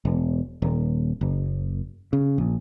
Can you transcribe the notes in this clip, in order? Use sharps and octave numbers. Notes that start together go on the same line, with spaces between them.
E1
D#1
F#1
C#3
A#1